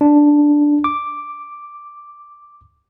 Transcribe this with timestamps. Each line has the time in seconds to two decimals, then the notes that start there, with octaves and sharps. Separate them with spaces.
0.01 D4
0.84 D6